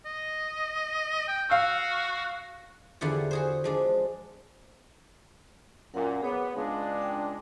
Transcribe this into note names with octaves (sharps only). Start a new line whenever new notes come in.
D#5
G5
F#4 F5 E6
E2 D3 E4 F4 G4 F#5
F#4 G#4 C5
F3 G#3 D4
F#2 A#2 A#4 F#5
B3 G#4 C#5 D6
C#2 G#3 D4 F5
G5